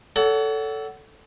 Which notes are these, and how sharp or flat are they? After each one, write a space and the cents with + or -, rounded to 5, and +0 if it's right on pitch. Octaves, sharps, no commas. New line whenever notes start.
A4 +0 C#5 +40 F#5 +20